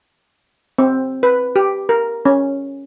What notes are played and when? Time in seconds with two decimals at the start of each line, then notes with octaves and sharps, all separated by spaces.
0.78 C4
1.23 B4
1.56 G4
1.89 A#4
2.25 C#4